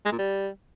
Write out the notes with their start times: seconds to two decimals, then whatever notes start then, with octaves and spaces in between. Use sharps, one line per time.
0.05 G#3
0.12 A#2
0.19 G3